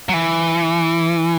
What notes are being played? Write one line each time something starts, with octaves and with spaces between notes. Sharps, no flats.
F#3
E3